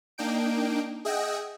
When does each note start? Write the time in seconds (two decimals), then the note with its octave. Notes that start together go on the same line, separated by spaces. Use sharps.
0.18 A#3 D4 D#4 G5 D7
1.05 G#4 D#5 E5 F#5 G5